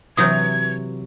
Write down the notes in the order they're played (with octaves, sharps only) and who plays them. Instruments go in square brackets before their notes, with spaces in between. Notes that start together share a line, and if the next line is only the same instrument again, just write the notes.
[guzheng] C3 E3 F#3 [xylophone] D#6 G6 [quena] G#6